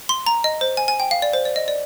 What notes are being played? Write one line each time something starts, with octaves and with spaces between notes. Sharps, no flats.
C6
A#5
D#5
C5
G#5
G#5
G5
F5
D5
C5
D5
D#5
D5